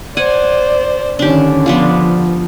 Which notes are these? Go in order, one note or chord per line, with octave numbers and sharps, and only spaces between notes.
C5 D5 F#5 G#5
D3 D#3 C#4 D4 G4
F3 B3 D4 F4